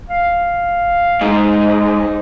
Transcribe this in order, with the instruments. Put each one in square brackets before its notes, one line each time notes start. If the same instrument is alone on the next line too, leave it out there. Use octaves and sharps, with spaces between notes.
[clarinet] F5
[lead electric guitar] G#2 [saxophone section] D#4